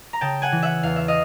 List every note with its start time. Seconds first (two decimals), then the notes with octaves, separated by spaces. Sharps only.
0.13 A#5
0.21 C#3 G5 A5
0.42 F#5 G#5
0.52 E3
0.62 E5 F#5
0.83 E2 F5
0.96 E5
1.08 D#5 F5